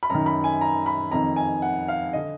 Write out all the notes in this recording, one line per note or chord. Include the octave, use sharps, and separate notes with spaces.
B5
F#2 D#3 A#5
B5
G#5
A#5
B5
F2 D#3 A#5
G#5
F#5
F5
D3 D#5